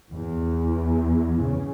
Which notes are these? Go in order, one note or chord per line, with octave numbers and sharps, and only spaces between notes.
E2
C#3